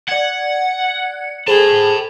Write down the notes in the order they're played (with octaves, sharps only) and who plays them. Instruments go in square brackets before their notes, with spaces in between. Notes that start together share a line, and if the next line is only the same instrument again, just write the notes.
[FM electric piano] D5 G#6 [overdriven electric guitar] F#5
[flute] G#4 [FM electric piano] A4 C5 [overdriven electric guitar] A5 B5